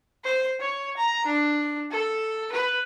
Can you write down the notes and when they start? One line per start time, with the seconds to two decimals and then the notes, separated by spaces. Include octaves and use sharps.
0.24 C5
0.60 C#5
0.97 A#5
1.26 D4
1.91 A4
2.52 B4